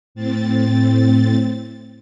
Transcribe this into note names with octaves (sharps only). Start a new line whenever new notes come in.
A2 C4 A6